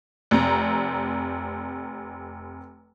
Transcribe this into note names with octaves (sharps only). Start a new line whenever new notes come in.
F1 C4 A#5